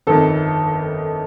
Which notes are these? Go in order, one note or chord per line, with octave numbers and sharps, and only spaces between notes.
G1 F2 D#3 A4